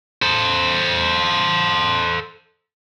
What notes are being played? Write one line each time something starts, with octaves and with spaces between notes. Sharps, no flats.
A4 C5